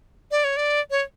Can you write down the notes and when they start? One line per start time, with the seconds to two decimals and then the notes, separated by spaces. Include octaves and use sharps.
0.31 D5
0.44 C#5
0.57 D5
0.91 C#5